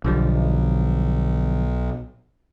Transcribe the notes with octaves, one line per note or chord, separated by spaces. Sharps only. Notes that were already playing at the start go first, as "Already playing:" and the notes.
B1 D3 F3 G3